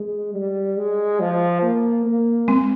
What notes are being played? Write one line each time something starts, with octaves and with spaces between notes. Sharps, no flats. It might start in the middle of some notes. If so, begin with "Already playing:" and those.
Already playing: G#3
G3
G#3
F3
A#3
A#3
G#3 C4